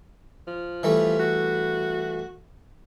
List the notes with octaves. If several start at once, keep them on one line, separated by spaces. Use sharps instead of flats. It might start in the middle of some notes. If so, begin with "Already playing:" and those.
F3
E3 G3 A3
F#4